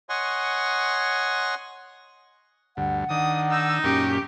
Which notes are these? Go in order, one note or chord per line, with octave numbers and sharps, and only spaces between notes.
C#5 D#5 F#5 G#5 C6 C#6
D2 G2 F#5
D#3 D4 D#6
D#4 E6
F#2 A#2 C#4 G4 C#6